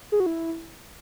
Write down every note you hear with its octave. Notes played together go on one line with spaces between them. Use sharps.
G#4
F#4
E4